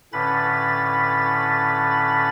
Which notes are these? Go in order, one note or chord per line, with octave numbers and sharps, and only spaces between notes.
A2 D3 C#4 B4 B5 A6